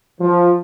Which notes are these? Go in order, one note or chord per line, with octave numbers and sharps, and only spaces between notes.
F3